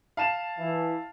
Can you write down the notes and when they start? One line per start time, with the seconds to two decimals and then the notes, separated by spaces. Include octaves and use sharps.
0.17 F5 A5 E7
0.59 E3 E4